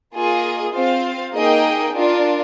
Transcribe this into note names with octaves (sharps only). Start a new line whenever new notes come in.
A#3 F4 G#4 D#5
C4 F4 C5 F5
A#3 D#4 G#4 D#5 G5
D4 F4 A#4